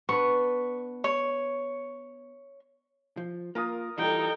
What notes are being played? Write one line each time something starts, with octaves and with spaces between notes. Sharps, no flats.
B3 D4 B4 C#6
C#5
F3
A#3 F4 A#4 D#6
E3 G3 D#4 F4 A4 G5